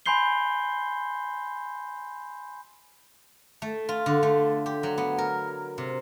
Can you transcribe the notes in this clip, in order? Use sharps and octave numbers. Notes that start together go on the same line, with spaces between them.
G#5 B5 C6 G6 C7 G7
A3
F4
D3
A3
G4
F#3
B3
A#4
C3